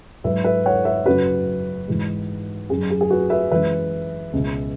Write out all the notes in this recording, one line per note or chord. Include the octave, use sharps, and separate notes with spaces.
G#2 F#3 B4 E5
B4 E5
C#5 F#5
B4 E5
F#2 C#3 F#3 F#4 B4
G#2 E3 G#3
F#2 F#3 G#4
G#4
G#4
F#4 B4
B4 E5
F#2 E3 G#3 B4 E5
C#2 B2 G#3